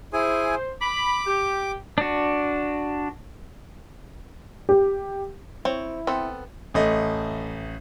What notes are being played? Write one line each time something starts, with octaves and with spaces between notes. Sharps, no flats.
E4 G#4 C5 G#5
B5 D6
G4
D4 F#4
G4
C4 E4 C#5
B3 C4 A4
A1 A3 D#5